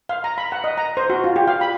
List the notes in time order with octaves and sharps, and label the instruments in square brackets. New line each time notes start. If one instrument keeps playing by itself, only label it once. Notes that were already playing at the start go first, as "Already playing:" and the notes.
[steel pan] F5
A#5
B5
F#5
D#5
A#5
C5
F#4
F4
G4
F5
B5